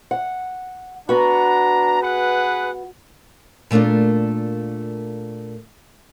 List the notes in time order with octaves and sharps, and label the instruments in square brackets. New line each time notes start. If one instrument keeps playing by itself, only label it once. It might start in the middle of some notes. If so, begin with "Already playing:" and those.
[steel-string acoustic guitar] F#5
[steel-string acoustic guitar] B3 F#4 [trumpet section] D4 A#5
[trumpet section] G#4 B4 F#5
[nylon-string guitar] A#2 A3 A#3 D4 F4